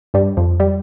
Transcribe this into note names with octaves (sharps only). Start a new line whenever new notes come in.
G2 G3
F2 F3
G3